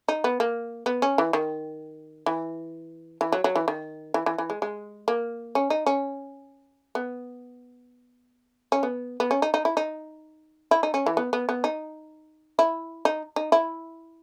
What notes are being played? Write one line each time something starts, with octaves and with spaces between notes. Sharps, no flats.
D#4
B3
A#3
B3
C#4
E3
D#3
E3
E3
F#3
F#3
E3
D#3
E3
E3
E3
G#3
G#3
A#3
C#4
D#4
C#4
B3
C#4
B3
B3
C#4
D#4
D#4
E4
D#4
E4
D#4
C#4
E3
B3
B3
B3
D#4
E4
D#4
D#4
E4